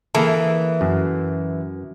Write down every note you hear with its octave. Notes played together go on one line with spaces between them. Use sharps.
E3 A#3 G#4 A4
F#2